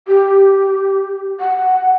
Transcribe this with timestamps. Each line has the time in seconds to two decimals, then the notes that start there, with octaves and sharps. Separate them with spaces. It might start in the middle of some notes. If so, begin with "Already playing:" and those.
0.08 G4
1.40 F#5